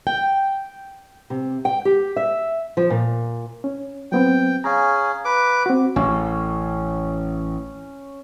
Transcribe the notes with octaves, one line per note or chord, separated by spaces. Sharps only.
G5
C3
G5
G4
E5
F3
A#2
C#4
F#3 B3 C4 G5
C#4 G#4 F5 A#5
B4 D6
C4 F#4
A1 C#4